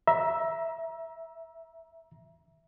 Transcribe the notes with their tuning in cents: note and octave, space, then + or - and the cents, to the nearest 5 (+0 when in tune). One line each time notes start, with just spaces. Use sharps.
E5 +0 A#5 +30